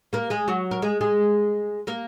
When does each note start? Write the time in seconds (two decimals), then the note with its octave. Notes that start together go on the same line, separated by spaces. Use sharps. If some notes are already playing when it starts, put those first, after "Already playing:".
0.13 A#3 A#4
0.30 G#3 G#4
0.48 F#3 F#4
0.71 A#4
0.82 G#3 G#4
1.01 G#3 G#4
1.87 A#3 A#4